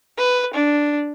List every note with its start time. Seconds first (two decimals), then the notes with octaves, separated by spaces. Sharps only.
0.18 B4
0.54 D4